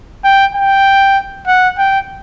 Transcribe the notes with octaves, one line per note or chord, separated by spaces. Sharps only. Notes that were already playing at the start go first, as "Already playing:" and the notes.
G5
G5
F#5
G5